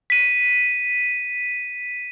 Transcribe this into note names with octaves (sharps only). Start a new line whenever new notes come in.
B6 D#7